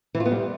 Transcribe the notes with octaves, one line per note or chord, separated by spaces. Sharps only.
E3
F4
B3
G3